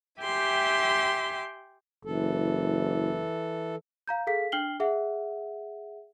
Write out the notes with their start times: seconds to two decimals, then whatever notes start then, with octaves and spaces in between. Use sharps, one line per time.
0.21 G4 E5 G5 G#5 C6
2.05 F#1 E3 A4
4.08 F5 A#5 G6
4.27 G#4 A4 F5 B6
4.52 D4 G5 F6 C7 F#7 G7
4.80 G#4 E5 F#5